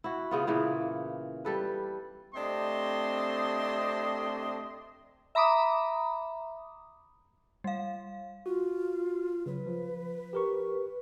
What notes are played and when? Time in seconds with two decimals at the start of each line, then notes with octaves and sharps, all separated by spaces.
0.04 E4 F#4
0.31 C#3 B3 F4
0.47 A#2 C#3 E3 B3
1.45 G3 A4 B4
2.35 C3 A3 C4 D4 D#5 C6
5.35 E5 A#5 B5 D6 D#6
7.64 G3 F5
8.46 F4 F#4
9.46 C#3 F#3 B4
9.67 F3
10.33 G4 A#4 C#6